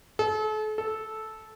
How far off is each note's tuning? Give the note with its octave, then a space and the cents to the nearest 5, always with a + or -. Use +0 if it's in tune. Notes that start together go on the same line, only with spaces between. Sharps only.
A4 -40
A4 -10